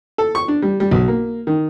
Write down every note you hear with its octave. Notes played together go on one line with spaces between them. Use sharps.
A4
C#6
D4
G3
G3
B1
A#3
D#3